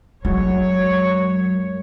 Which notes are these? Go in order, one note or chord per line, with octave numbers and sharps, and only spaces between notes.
F#2 G#3 C#5